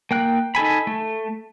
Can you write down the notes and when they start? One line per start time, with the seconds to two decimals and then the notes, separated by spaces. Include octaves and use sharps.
0.11 A#3 G5 F#6
0.55 D#4 A4 G#5 B5
0.87 A3